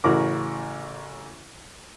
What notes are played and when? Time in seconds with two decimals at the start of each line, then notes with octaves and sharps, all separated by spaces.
0.04 A1 C#3 E3 F#4 A#4 D6